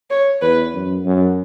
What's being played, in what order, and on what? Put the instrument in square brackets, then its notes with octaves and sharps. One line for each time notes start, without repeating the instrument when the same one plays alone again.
[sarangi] C#5
[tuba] E2 [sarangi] B4
[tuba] F#2
F#2